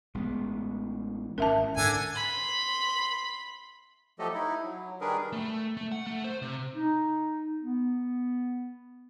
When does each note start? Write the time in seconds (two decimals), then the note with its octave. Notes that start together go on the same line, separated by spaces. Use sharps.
0.15 A1 G#3 B3
1.38 G#1 C#4 A#4 E5 A5
1.77 G#2 D3 G#5
2.15 B5 C6
4.19 F3 F#3 A3 G4 A4 D#5
4.34 D#4 E4
4.64 F#3
5.01 D#3 G3 D4 G#4 A#4 B4
5.33 A3
5.77 A3
5.92 F#5
6.07 A3
6.24 C5
6.42 C3
6.74 D#4
7.62 B3